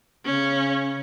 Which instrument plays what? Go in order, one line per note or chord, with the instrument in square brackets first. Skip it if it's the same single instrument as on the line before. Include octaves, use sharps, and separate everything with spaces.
[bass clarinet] C#3 [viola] C#4